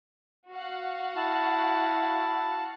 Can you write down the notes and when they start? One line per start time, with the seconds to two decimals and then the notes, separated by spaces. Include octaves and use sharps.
0.50 F#4 F5 F#5
1.17 E4 A5